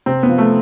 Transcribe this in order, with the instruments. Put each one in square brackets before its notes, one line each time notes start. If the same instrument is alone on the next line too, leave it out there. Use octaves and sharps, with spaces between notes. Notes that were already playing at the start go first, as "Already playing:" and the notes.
[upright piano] C3 C4
B3
F3
A3